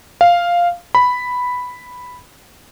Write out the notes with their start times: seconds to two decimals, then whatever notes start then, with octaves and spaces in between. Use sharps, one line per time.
0.21 F5
0.95 B5